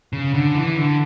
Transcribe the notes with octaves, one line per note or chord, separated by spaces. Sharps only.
C#3
D3
E3
D3